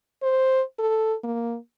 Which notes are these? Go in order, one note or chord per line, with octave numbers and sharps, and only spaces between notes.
C5
A4
A#3